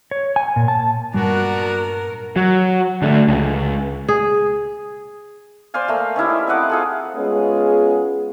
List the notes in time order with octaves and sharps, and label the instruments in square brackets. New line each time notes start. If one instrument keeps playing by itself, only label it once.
[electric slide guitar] C#5
G#5
A#2
A5
[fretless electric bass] G2 A#2 F#3 [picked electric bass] G3 [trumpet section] B3 D4 F#4 [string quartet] A#4
[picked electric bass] F#3
D3 G#3 A3
C#2
[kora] G#4
[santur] C5 D5 F5 G#5
A3 A#3
C#4 D#4 E4 G4
D5
C4 D#5 F#5 D6
F4 G#4 A4
[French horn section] G#3 B3 C#4 F4 G#4